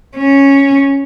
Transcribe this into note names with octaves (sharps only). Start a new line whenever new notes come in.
C#4